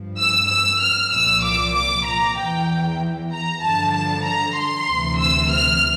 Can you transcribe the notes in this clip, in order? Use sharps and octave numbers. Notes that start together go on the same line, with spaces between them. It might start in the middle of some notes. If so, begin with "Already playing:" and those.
Already playing: G2 F3
E6
E6
F6
C2 A#2 F3 E6
D6
D6
A#5
E2 E3 G5
A#5
G2 D3 F3 A5
A5
A#5
C6
D2 C3 E3
E6
F6